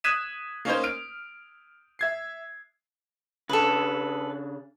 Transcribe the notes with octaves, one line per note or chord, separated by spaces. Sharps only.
D#6 F#6 G#6 B6 D#7 E7
A#3 C#4 D#4 C5
F6 D7
E5 G#6 C7
C#3 D4 A4 B4